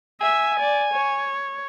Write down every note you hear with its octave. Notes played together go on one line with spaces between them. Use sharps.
E5 G#5
D5
C#5